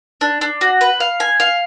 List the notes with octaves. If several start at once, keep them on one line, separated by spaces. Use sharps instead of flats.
D4
D4
F#4
B4
F5
G#5
F5